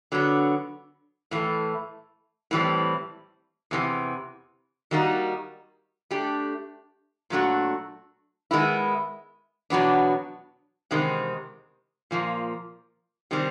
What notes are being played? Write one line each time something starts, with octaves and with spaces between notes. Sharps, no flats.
D3 F#3 B3
A2 E3 A3
A2 E3 G3 C4
E2 C3 E3
D#3 G3 A#3 D#4 F#4
A3 D4 G4
A#2 F#3 A3 D4 F#4
D#3 G#3 B3 E4
E2 B2 F#3 B3 D4
E2 C3 D#3 G#3 C4
A#2 F3 A#3
C3 D#3 G3 C4